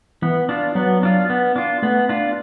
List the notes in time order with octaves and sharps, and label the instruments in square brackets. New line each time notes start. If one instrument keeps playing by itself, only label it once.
[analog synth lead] E3 [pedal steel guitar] B3
[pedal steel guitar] D4 F4
[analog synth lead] F#3 [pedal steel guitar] B3
[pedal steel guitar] D4 F4
B3
D4 F4
[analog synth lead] A3 [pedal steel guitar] B3
[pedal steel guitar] D4 F4